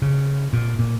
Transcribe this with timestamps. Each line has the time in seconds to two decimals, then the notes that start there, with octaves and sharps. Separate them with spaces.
0.02 C#3
0.53 A#2
0.79 A#2